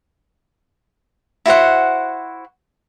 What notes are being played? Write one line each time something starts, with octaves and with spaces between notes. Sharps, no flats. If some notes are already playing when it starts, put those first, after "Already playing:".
E4 F#4 C5 F#5